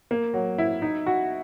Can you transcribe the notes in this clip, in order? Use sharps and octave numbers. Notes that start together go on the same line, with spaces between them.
A#3
F#3
E4
D#4
F#4